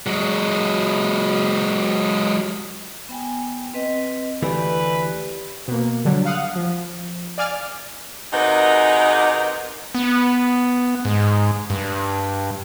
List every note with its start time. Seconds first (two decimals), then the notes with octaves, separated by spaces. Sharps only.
0.06 F#3 G#3
3.09 B3 G5 G#5
3.74 C4 B4 D#5
4.43 D2 E3 A3 G4 B4 D5 G#5
5.68 B2 A#3
6.05 D3 F#3 G3
6.25 F5 F#5 D#6
6.56 F3
7.38 D5 F5 G#5 D6 F6 A6
8.33 C3 D#4 F#4 G#4 A#4 B4
9.95 B3
11.05 G#2
11.70 G2